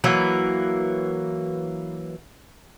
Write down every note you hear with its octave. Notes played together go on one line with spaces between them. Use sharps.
E3 F#3 A#3